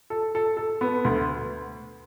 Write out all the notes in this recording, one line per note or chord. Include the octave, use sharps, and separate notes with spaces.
A4
A4
A4
B3
D2